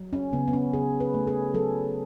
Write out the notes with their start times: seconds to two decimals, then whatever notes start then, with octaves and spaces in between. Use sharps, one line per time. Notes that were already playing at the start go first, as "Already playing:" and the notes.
Already playing: F#3
0.13 C#4
0.33 C#3 B3
0.48 B3
0.53 C#4
0.73 C#3 G#4
1.00 B4
1.14 A3
1.27 G#4
1.54 F#3 A4